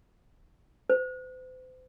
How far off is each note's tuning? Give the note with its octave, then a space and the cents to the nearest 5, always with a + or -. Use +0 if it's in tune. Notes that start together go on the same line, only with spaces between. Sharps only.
C5 -40